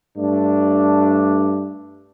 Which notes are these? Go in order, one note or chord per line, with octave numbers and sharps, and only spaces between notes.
G2 A3 D4